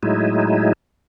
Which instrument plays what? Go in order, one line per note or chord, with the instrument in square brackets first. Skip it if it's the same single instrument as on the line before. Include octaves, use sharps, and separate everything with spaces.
[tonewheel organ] A2 F#3 G#3 D#4 E4